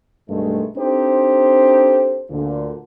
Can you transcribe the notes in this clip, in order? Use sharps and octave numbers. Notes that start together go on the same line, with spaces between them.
B1 G2 D#3 G#3 A3
C4 D4 D#4 G4 A4 C5
D2 A#2 D3